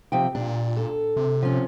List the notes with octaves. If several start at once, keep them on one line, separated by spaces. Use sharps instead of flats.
C3 F3 G5
A#2 D4
A4
C3
F3 C#4